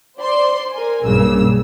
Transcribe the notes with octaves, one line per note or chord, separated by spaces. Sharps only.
C5 D5 C6
A#4 G#5
B1 G2 C#3 A#3 E6